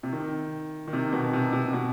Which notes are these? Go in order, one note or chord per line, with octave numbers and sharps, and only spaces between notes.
C3
D#3
D#3
C3
B2
C3
C3
B2